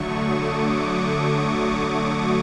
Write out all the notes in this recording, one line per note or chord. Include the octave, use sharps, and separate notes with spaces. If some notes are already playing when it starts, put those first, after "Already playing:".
Already playing: D3 F#3 A3 C#6 D#6
D6